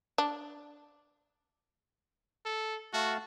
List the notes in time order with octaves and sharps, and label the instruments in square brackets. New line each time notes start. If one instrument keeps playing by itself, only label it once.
[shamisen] D4
[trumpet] A4
[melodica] A3 F5 A5 [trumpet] F#4